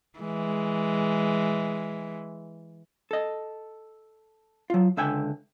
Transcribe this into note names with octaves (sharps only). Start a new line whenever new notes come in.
E3 G#3
A4 D#5
F#3 F4
C#2 D3 E5 G5 G#5